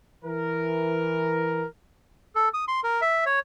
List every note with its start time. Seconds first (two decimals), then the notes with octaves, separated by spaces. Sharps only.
0.24 E3 A#4
2.35 A4
2.54 D#6
2.68 C6
2.83 A#4
3.01 E5
3.26 C#5